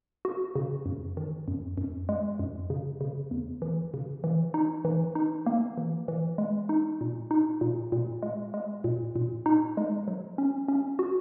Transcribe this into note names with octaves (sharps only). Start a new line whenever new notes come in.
F#4
C#3
F#2
D#3
F#2
F#2
G#3
F#2
C#3
C#3
E2
E3
C#3
E3
D#4
E3
D#4
A#3
E3
E3
G#3
D#4
A#2
D#4
A#2
A#2
G#3
G#3
A#2
A#2
D#4
G#3
F#3
C#4
C#4
F#4